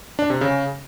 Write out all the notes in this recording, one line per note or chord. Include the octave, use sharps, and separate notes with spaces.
D4
C3
C#3